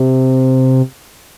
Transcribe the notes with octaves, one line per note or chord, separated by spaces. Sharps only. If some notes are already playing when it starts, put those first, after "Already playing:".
Already playing: C3